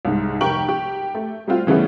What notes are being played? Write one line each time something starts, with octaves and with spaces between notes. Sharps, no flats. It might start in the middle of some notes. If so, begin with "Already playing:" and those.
C2 G#2
F1 G4 A#4 G5 C#6 F#7
G4
A3
G3 A3 C4 F4 F#4
C#3 E3 G3 A3 B3